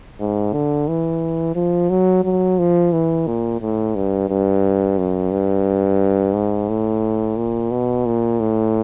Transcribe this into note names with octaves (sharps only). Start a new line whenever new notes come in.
G#2
D3
E3
F3
F#3
F#3
F3
E3
A#2
A2
G2
G2
F#2
G2
G#2
A2
A#2
B2
A#2
A2